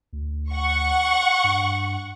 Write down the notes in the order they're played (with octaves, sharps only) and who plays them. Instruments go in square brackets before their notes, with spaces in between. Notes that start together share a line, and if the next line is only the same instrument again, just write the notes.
[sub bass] D2
[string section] F#5 C#6
[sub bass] G2